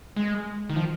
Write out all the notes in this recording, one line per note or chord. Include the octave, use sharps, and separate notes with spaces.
G#3
D#3
F3